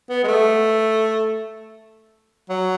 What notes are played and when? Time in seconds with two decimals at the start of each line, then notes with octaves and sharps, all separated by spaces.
0.09 B3
0.24 G#3
0.28 A3
2.50 F#3